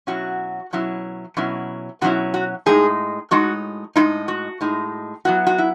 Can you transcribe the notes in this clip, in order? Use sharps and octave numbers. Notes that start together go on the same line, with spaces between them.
B2 F#3 C#4 E4 F#4
B2 F#3 C#4 E4
B2 F#3 C#4 E4
B2 F#3 C#4 E4 F#4
F#4
A2 G#3 D#4 G#4
A2 G#3 D#4 F#4
A2 G#3 D#4 E4
F#4
A2 G#3 D#4
F#3 B3 E4 F#4
F#4
E4